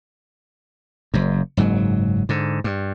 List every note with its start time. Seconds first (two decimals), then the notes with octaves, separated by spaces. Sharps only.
1.14 F#1 F#2
1.57 F#1 G#2 F#3
2.29 G#2 D3
2.64 G2